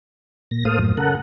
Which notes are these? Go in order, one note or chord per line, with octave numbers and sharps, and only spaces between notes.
A#2 A#6
A2 A#3 A4 C5 F5 D#6
F#2 A2
C#3 A4 A#4 F#5